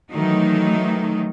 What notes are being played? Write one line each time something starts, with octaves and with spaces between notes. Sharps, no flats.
D#3 E3 F#3 A3 D#4